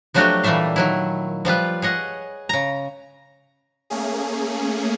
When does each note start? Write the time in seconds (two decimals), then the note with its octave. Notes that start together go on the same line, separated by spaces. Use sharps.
0.14 F3 F#3 A3 D4 F#4 G4
0.43 A#2 E3 G3 A3 E5 F5
0.76 D#3 F#3 E4
1.45 F3 G3 F4 B4
1.82 G#4 C#5 D#5 F#5
2.49 C#3 A#5
3.90 A3 A#3 C#4 G#4